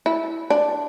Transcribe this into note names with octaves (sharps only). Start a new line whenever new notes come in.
E4
D4